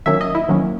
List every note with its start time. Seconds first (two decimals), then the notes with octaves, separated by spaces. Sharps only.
0.06 D#3 F#3 A#3 C#4 E5
0.21 D#5
0.35 E4
0.49 D#3 F#3 A#3 C#4